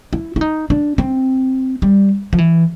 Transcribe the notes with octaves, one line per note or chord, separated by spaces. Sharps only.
E4
E4
D#4
D4
C4
G3
F3
E3